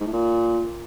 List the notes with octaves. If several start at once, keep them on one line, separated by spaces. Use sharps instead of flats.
G#2
A2
A#2